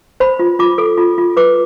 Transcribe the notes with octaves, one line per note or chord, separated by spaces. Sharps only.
C5 B5
F4
F4 D6
A4
F4
F4
B4 D6